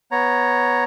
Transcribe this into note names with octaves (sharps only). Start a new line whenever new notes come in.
B3 C#5 A#5